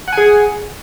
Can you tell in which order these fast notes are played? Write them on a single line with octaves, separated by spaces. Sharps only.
F#5 G#5 G#4